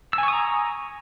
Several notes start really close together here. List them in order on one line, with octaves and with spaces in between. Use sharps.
E6 G#5 C#6 D#6 A#5